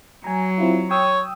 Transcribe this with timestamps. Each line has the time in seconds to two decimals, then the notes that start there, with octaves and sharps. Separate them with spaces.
0.24 F#3 G#5 A#5
0.58 C4 E4 F4
0.91 C#5 G5 D#6 E6